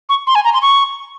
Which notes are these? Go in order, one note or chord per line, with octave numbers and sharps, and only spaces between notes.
C#6
C6
G#5
A#5
C6
C#6